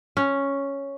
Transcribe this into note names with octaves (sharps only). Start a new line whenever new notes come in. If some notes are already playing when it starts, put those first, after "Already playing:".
C#4